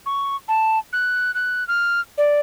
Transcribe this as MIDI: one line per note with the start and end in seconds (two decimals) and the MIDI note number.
0.06 0.36 85
0.48 0.79 81
0.93 1.34 90
1.35 1.66 90
1.68 2.01 89
2.18 2.40 74